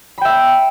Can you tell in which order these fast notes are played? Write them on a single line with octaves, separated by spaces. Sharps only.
B5 G5 E5